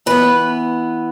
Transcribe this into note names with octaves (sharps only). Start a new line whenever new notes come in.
E3 B3 B4